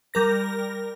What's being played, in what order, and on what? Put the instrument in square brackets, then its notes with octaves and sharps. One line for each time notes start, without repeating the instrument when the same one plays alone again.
[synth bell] G3 A#4 A#6